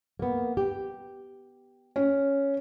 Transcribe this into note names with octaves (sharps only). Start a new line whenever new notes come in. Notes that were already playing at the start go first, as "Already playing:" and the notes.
A#3 B3
G4
C#4